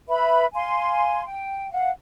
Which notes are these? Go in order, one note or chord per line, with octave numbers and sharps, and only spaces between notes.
B4 E5 B5
F5 G#5 C6
G5
F5 F#5